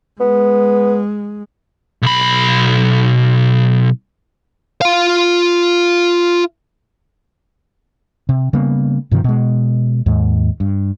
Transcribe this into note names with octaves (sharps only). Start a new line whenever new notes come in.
G#3 B3
B1 B5
F4 F5
C3
C#3 G3 A#3 B3
G2 C3 D#3 F3
B2 G#3
D#2 G#2
G2